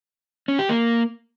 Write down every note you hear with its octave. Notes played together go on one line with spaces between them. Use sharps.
C#4
G4
A#3